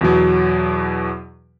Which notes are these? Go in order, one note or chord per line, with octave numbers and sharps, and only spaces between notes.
E2 B2 F#3